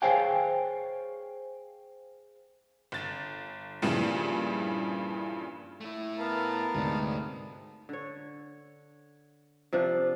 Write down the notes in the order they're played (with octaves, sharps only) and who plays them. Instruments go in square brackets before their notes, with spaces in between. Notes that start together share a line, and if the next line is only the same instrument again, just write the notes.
[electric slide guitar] G#4 C5 C#5 F5 G5 G#5
[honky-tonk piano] G1 A6
G2 A#2 C#3 E3 F3 G3
[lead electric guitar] A3 E4
[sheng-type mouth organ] B3 F5 A5 [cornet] A#4
[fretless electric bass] D2 G#2 C3 [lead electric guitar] A3 D5
[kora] D3 C#5
C3 F3 D4